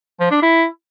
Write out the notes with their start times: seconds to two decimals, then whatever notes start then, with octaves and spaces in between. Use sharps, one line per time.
0.20 F3
0.31 D4
0.42 E4